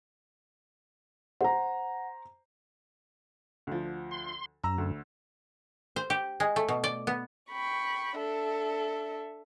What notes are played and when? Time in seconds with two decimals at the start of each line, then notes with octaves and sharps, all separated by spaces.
1.41 C5 F#5 A#5
3.67 D2 F3
4.11 C6
4.64 F#2 A#5 E6
4.78 D2
5.96 C5
6.10 G4
6.40 G#3
6.56 A3
6.69 B2
6.84 D5
7.07 B3
7.51 G5 B5 C#6
8.18 D4 A4 E5